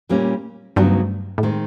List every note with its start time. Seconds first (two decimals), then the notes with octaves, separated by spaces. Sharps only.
0.09 A#2 G3 A#3 C#4
0.76 D2 G2 C#3 F#3 B3 D#4
1.38 A2
1.43 D#3 G#3 C4